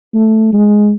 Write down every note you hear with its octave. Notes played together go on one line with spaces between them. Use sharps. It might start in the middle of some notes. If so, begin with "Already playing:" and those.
A3
G#3